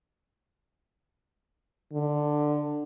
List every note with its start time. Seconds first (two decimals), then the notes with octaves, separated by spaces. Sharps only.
1.93 D3